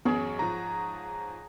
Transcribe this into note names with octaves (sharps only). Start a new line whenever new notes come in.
A1 F#2 B3 G#4 C#5
G#2 F3 A#5